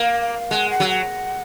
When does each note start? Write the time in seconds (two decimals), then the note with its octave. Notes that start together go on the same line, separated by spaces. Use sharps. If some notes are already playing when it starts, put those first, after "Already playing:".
Already playing: A#3
0.22 F5
0.51 G#3 F#5
0.71 F#5
0.80 F#3
0.89 F#5